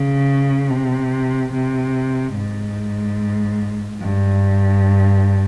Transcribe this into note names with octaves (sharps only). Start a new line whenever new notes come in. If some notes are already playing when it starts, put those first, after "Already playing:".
Already playing: C#3
C3
C3
G#2
G2